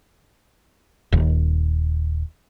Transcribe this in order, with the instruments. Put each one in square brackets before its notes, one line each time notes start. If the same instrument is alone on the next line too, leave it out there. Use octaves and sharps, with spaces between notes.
[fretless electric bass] D#1 D#2